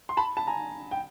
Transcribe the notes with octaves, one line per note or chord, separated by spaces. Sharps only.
C6
A5 B5
A5 B5
G#5 A#5
G5